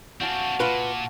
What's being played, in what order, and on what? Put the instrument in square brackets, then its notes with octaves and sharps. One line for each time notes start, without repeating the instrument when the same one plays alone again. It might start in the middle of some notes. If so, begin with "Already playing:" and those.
[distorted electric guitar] C4 D4 [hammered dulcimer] F#4 F5 A5
[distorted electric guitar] A#2 [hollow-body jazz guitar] F4 B4